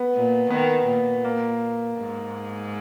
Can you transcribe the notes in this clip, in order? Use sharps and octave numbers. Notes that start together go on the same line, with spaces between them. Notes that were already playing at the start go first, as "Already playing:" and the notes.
Already playing: B3
A#2
D#3 B3
A#2
A#3
G#2